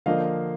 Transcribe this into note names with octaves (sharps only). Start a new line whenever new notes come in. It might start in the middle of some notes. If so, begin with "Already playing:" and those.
D3 F3 A#3 D#5 F5